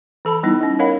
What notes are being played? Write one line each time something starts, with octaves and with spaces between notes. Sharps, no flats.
E3 A4 A5 B5
G3 B3 D#4 E4
G3 C#4
A#4 C#5 D#5 F5 F#5 B5